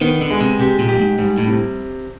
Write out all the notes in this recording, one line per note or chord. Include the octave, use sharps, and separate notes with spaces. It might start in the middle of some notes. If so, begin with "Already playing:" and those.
D#3 B3
D3
G#3
C3
C3 G4
A#2
G4
G2
G#2
G#2 G3
A2
C3